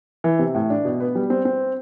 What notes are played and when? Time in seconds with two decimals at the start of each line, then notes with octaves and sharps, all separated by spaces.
0.24 E3
0.39 C3
0.55 A2
0.70 D4
0.85 B2
1.00 B3
1.15 G3
1.30 C4
1.45 C4